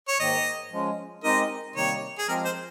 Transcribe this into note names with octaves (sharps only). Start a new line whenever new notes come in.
C#5
G#2 D#3 A#3 D#5
F3 G#3 C#4
G#3 C4 D#4 G4 A#4 D#5
C3 D#3 G3 A#3 D#4 C#5
G#4
F3 G#3 C4 G4 A#4
C5